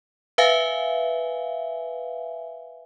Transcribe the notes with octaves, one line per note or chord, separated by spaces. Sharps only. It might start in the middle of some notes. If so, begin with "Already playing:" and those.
B4 E5 F5 G#5